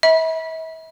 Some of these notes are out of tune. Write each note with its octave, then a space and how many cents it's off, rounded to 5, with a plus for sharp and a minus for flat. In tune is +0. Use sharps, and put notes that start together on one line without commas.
E5 -40 B5 -30